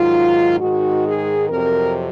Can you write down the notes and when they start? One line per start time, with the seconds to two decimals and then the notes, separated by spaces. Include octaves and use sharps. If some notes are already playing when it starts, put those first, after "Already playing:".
Already playing: G#2 D#3 F#3 F4
0.60 G#2 D#3 G#3 F#4
1.05 G#4
1.49 F2 C3 F#3 A#4